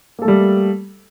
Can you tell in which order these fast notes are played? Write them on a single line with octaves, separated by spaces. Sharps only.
A#3 A4 A3 G3